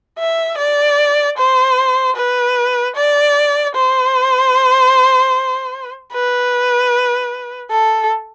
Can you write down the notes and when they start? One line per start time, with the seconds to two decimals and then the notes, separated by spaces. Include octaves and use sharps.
0.19 E5
0.58 D5
1.38 C5
2.16 B4
2.96 D5
3.75 C5
6.13 B4
7.71 A4